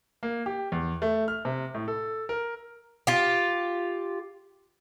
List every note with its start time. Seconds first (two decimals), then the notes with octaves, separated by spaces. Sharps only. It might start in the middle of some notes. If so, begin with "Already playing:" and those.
0.23 A#3
0.46 G4
0.72 E2
1.02 A3
1.28 F6
1.45 C3
1.74 A2
1.88 A4
2.29 A#4
3.07 F4 G4